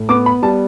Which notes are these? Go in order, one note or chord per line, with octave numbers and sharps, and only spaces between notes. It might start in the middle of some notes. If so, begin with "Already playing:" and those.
Already playing: A2
B3 D6
B5
G3 A5